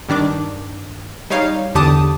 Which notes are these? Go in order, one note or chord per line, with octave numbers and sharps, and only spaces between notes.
G2 D#3 D4 D6
G3 D#4 C#5 F5
E2 D3 G4 A5 D6 D#6